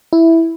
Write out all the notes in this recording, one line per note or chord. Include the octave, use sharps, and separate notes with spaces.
E4